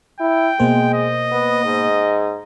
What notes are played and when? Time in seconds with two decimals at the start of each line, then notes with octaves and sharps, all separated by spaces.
0.20 E4 G5
0.60 B2 G#3 A#3 C5
0.94 D#5
1.32 B3
1.65 G#2